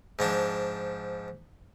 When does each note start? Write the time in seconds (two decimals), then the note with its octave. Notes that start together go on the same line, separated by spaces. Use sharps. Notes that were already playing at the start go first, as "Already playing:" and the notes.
0.19 G#2 F3 D4